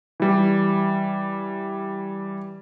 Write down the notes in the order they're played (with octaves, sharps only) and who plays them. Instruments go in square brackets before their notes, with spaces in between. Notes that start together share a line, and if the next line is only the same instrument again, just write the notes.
[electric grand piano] E3 G3